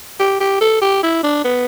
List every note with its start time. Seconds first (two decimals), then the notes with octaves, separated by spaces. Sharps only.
0.19 G4
0.40 G4
0.61 A4
0.81 G4
1.03 E4
1.23 D4
1.45 B3